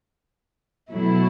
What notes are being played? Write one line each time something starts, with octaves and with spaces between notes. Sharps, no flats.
B2 F#3 A3 E4